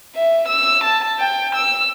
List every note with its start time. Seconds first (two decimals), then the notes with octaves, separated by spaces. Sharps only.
0.15 E5
0.48 E6
0.84 A5
1.19 G5
1.55 E6